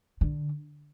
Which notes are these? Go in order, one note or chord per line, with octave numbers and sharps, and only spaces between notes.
D3